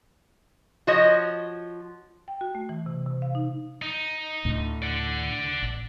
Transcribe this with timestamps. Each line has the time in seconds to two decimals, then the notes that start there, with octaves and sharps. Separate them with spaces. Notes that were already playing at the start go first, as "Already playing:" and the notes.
0.87 F3 F#4 C#5 D#5
2.28 G5
2.41 F#4
2.55 A3
2.69 E3
2.86 C3
3.06 C3
3.22 F5
3.35 D#4
3.82 D#4
4.45 D2 A2 D3
4.82 D5 F#5
5.62 A1